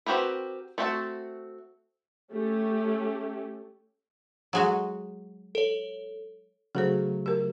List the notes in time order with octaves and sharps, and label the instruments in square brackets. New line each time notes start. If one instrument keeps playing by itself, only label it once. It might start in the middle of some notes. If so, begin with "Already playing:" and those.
[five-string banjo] C4 F#4 G4 A#4 B4
A3 C4 D4 F#4 A5
[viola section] A3 C#4 G4
[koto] F#3 G#3 F#4
[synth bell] A4 C#5
[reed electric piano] C#3 F#3 A3 [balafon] G#4 A4 C5
[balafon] G4 A#4